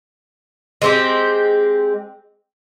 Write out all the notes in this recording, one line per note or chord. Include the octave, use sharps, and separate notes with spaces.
G#3 C4 G4